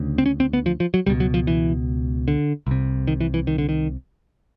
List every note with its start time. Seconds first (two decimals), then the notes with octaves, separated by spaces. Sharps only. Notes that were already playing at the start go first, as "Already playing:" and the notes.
Already playing: D2 C#3
0.18 C4
0.26 C#4
0.40 C4
0.53 B3
0.66 F3
0.80 F3
0.94 F#3
1.06 C#2 B2 G3
1.20 F#3
1.34 F3
1.47 E3
2.28 D3
2.67 C2 C3
3.07 D#3
3.21 E3
3.34 E3
3.47 D#3
3.58 D3
3.69 D#3